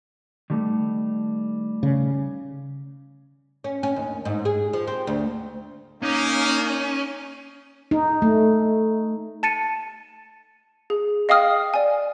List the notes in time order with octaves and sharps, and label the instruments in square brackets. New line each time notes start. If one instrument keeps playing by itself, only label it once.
[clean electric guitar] D#3 G3 A3
[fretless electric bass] C#3
[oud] C#4
C#4
D#2
G#2
G#4
F3
C4
D2
[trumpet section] A#3 [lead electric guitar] C#4 [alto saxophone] D#4
[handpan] D#4
A3
[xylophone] A5 A6 C#7 D#7
G#4
D#5 F5 G5 D#6 F6
D5 G#5